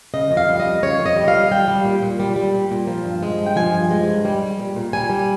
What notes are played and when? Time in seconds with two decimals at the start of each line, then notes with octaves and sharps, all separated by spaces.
0.14 C#3 D#5
0.31 F2
0.37 F5
0.49 G3
0.60 D#5
0.65 F2
0.83 C#3 C#5
0.99 F2
1.06 D#5
1.16 G3
1.28 F5
1.34 F2
1.51 G3 G5
1.68 G3
1.85 A#2
2.03 A#2
2.20 G3
2.36 G3
2.54 A#2
2.71 A#2
2.87 F3
3.05 G2
3.23 G#3
3.39 G2
3.46 G5
3.56 F3 G#5
3.74 G2
3.91 G#3
4.08 G2
4.25 G3
4.42 G3
4.59 A#2
4.76 A#2
4.93 G3 G#5
5.10 G3